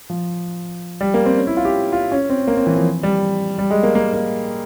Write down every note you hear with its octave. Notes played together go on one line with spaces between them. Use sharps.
F3
G3
A#3
C4
C#4
E4
F4
G4
F4
C#4
C4
A#3
C4
E3
F3
G3
G3
G#3
A#3
A#3
A#3